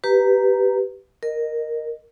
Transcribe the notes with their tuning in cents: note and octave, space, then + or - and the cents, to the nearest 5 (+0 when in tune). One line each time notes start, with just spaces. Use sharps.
G4 -15 B4 +0 A#5 -5
A#4 +0 D#5 -15